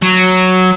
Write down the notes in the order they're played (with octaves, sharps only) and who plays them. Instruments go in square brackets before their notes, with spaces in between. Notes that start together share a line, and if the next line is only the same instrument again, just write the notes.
[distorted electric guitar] F#3